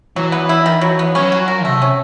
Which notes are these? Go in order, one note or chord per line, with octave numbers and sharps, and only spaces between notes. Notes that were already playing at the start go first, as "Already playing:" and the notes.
E3 F#3
B3
E4
D#3
F#3
B3
F#3 C#4
F#4
A#4
C3 A3
C#4